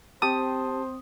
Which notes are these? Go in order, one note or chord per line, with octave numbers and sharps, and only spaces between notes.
C4 G4 C5 A5 D#6